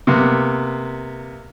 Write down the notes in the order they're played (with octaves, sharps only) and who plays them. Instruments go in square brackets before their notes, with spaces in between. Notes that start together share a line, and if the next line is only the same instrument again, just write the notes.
[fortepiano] C3 A#3 B3